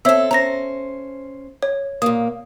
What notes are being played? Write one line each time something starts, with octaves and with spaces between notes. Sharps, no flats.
C4 A4 C#5 E5 E6
C#4 C5 A#5 A#6
C#5
A#2 A#3 D#6